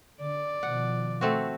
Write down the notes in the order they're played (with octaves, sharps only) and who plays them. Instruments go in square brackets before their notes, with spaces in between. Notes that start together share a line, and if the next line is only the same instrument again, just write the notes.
[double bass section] D3 [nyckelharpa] D5
[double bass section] B2 D#3 F3 [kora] F#5
[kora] A3 C4 F#4